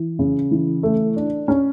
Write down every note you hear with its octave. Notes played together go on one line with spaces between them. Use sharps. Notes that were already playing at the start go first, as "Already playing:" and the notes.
Already playing: E3
C#3
E3
A3
D4
C#4